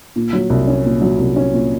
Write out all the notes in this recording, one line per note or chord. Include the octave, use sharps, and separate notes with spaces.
A#2
F#3
C2
C#4
A#2
F#3
C2
C#4
A#2